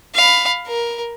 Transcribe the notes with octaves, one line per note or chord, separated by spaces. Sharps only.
F5 B5
A#4